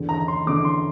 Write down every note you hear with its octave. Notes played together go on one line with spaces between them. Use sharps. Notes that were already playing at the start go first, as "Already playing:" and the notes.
Already playing: E2 D3
A#5
C6
E2 D3 D6
C6